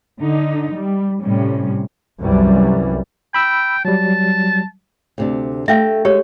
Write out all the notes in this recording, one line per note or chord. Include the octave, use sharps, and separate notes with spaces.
D3 D#4
G3
A2 C3 G3 C#4
C2 F#2 E3 G3
G5 B5 E6
F#3 G3 A5
D2 C3 D4
A3 E5 F5 G5
G#3 G4 C#5